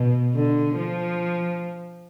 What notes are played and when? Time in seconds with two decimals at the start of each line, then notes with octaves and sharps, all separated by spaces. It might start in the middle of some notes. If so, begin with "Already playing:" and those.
Already playing: B2
0.35 D3
0.77 F3